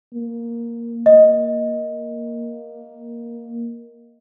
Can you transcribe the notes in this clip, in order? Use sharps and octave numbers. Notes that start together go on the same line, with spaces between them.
A#3
A#3 D#5